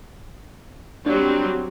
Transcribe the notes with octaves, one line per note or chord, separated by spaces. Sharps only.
F#3 G3 C4 D4